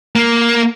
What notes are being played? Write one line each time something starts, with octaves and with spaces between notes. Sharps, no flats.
A#3